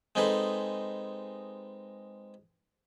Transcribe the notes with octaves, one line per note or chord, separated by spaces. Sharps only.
G#3 C4 D#4 G#4 A4 B4